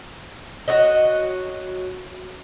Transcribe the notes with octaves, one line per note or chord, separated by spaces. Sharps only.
F#4 C#5 D#5